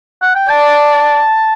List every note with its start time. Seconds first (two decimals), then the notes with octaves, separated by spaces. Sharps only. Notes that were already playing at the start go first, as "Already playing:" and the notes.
0.22 F#5
0.35 G5
0.49 D5 A5